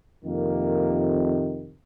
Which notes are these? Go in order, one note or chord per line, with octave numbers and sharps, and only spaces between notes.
F2 C3 D#3 A#3